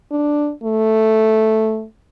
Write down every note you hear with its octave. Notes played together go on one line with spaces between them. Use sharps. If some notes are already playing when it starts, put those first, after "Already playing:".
D4
A3